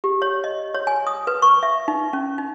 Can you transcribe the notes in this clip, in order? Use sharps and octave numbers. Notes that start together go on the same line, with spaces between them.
G4
C#5
D#5
C#5
G#5
D#6
B4
C#6
E5
D#4
C#4
D#4